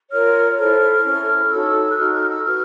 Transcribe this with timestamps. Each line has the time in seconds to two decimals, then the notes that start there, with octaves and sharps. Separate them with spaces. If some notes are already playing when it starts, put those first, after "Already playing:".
0.10 F4 A#4 C#5 F6
0.57 E4 A4 C5 F6
1.03 C#4 E4 A4
1.50 D#4 F#4 A4 C#5 E6
1.88 F#6
1.97 D#4 F#4 A4 F6
2.14 F6
2.29 E6
2.45 F#4 B4 F6